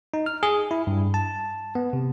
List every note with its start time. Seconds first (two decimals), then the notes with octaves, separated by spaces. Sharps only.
0.14 D#4
0.26 F6
0.43 G#4
0.71 E4
0.87 G2
1.14 A5
1.75 B3
1.93 C3